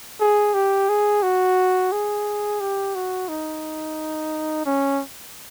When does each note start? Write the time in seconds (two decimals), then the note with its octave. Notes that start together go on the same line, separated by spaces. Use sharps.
0.21 G#4
0.54 G4
0.89 G#4
1.23 F#4
1.92 G#4
2.61 G4
2.95 F#4
3.29 D#4
4.66 C#4